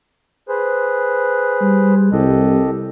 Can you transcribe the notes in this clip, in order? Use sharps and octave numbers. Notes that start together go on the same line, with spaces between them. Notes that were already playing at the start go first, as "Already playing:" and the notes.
G#4 B4 C5
G3
C2 G4 A4 D#5